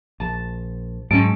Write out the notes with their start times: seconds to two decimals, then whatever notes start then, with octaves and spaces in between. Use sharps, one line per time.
0.20 A#1 A5
1.11 G#2 F#3 C4 C#4 A5 D7